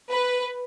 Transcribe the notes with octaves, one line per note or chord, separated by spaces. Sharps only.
B4